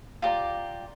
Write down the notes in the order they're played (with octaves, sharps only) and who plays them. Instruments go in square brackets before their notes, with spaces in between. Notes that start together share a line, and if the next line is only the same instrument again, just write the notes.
[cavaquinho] F4 G4 D5 A#5